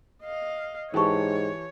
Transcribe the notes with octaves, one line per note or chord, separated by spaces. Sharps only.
D#5 F5
G#2 E3 G4 A#4 C#5 A5 C#6